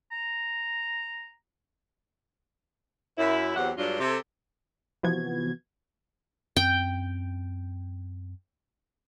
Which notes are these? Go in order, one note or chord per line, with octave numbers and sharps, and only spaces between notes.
A#5
F#2 E4
E2 F#3 C4 G4 F#5
G2 F#3 G#3 D4 F4
C3 A4
C3 E3 F3 B3 F#4 G#6
F#2 C4 G5